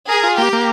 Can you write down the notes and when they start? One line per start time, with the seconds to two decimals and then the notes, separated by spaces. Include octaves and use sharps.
0.09 G#4 A#4
0.23 F4
0.38 A#3 G4
0.53 A#3